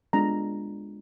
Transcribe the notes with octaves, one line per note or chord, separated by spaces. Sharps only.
G#3 B3 D4 F4 A#5